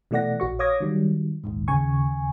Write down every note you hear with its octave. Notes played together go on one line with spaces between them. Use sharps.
B2 E3 A3 D5 F#5 A#6
A#1 F#4 C#6
C#5 F5 D6 D#6 G#6 A#6
D#3 F#3 G3
A#1 D#2 G#2
D#2 C#3 G#5 C#6